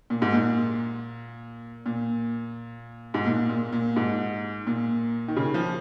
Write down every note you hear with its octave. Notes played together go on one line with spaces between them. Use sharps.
A#2
G#2
A#2
A#2
G#2
A#2
A#2
A#2
G#2
A#2
D#3
C#3
F3